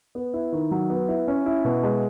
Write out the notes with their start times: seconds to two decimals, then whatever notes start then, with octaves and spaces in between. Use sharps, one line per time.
0.15 B3
0.34 E4
0.52 D#3
0.71 F#3
0.90 B3
1.08 E4
1.28 C#4
1.46 E4
1.65 B2
1.83 G#3